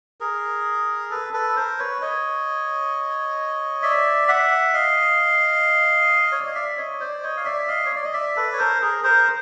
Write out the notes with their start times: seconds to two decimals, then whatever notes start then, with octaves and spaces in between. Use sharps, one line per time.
0.20 G#4 A#4
1.11 A4 B4
1.33 A4 B4
1.56 A#4 C5
1.79 B4 C#5
2.01 C#5 D#5
3.83 D5 E5
4.28 E5 F#5
4.74 D#5 F5
6.32 C#5
6.39 D5
6.47 D#5
6.55 D5 E5
6.77 C#5 D#5
7.00 C5 D5
7.23 C#5 D#5
7.37 F5
7.45 D5 E5
7.68 D#5 F5
7.86 C#5
7.95 D5
8.04 D#5
8.13 D5 E5
8.36 A4 B4
8.53 C#5
8.58 A#4 C5
8.82 G#4 A#4
9.04 A#4 C5